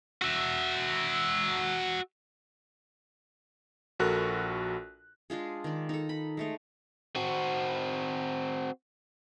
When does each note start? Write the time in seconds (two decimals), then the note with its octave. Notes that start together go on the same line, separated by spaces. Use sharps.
0.22 F#4 E5
3.99 A#1 F#4 A4 A#4 F#6
5.30 G#3 D4 F4 G#4
5.64 D#3 D5
5.89 D#4 A4
6.09 B5
6.37 G#3 A3 D#4
7.16 C4 F#4